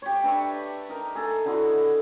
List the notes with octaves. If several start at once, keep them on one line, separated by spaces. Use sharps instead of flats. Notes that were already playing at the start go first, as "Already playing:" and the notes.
G4 C#5
D4 B4 E5 C#6
D#4 A#4
G#4 A4
D3 E4 F#4